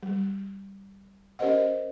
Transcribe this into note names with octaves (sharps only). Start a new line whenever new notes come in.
G3
C#4 G4 A#4 C5 D#5 F#5